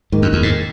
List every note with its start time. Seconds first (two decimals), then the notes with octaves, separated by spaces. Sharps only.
0.12 D#2 G#2 D#3 A#3
0.22 F#2
0.33 E2
0.43 G#2